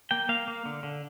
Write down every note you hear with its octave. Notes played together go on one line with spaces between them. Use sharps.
A#3 G5
A#3 F5
A#3
D3
D3